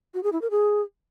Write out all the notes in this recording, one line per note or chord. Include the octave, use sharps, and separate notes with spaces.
F#4
G#4
E4
A#4
G#4